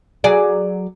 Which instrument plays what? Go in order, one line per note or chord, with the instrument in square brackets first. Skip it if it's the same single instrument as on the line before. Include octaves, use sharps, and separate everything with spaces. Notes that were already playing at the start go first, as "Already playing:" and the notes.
[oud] F#3 G#4 D5